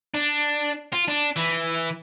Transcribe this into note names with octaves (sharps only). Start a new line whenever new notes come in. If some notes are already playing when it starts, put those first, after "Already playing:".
D4
F4
D4
E3